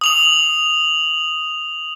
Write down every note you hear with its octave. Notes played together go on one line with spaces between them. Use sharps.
D#6 F7 F#7